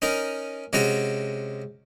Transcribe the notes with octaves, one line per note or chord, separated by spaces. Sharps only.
C#4 D#4 A#4
C3 G#3 C#4 F#4 A#5